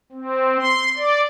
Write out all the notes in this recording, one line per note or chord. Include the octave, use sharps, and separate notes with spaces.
C4
C6
D5